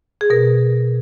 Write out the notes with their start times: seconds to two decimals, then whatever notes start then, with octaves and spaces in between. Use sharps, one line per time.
0.21 G#4
0.30 B2 A#4